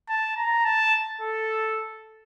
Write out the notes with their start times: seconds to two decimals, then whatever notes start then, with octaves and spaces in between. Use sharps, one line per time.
0.09 A5
0.37 A#5
0.65 A5
1.22 A4